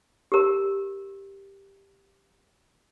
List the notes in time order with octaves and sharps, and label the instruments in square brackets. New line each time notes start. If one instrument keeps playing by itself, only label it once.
[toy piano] G4 A#4